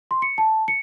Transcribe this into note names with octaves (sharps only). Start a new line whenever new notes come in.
C6
C#7
A5
C#7